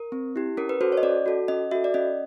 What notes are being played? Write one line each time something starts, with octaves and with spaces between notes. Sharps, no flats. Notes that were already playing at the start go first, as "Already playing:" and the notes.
Already playing: A#4
C4
E4 G4
C#4 A#4
B4
F#4 A4 C5
C#5
D#5
C#4 D5
F#4 A4
C#4 D#5
F#4 A4 E5
D5
C#4 D#5